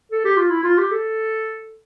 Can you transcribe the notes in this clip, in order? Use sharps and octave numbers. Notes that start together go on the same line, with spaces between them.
A4
G4
F4
E4
F4
G4
A4